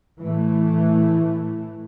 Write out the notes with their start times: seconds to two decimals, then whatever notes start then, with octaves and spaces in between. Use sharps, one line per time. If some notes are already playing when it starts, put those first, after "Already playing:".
0.20 A2 E3 A3